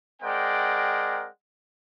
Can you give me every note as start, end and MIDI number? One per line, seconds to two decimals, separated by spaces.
0.22 1.28 56
0.22 1.28 60
0.22 1.28 70
0.22 1.28 74
0.22 1.28 78
0.22 1.28 79